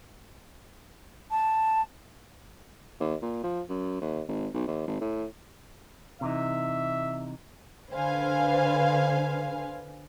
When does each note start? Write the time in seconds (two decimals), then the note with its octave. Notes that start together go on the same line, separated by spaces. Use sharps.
1.30 A5
3.00 D#2
3.22 A#2
3.43 F3
3.69 F#2
4.01 D#2
4.29 G#1
4.54 B1
4.67 D#2
4.88 G#1
5.01 A2
6.21 C3 E3 D#4 E5
7.91 D3 B4 C5 F5 G#5